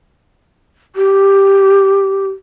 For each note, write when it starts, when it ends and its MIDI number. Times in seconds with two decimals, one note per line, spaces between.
0.96 2.28 67